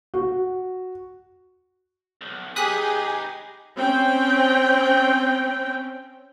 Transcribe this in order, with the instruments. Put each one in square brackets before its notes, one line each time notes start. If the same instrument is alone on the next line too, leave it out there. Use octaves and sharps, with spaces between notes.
[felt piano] F#4
[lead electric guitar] B1 F2
[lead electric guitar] D#4 B4 [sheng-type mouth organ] G4 [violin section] G#4 [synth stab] D#6 F#6 B6
[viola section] C4 C#4 G5